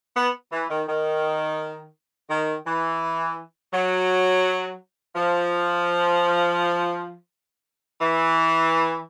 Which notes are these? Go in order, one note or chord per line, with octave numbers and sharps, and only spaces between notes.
B3
E3
D#3
D#3
D#3
E3
F#3
F3
E3